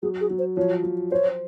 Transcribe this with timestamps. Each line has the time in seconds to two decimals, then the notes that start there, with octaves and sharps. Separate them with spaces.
0.02 F#3 G#4
0.21 G#4
0.30 F#3
0.39 C5
0.57 F3 C#5
0.83 F3
1.11 C5 C#5